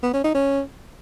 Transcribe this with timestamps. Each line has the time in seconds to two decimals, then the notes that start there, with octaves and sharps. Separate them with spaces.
0.03 B3
0.13 C#4
0.24 D#4
0.34 C#4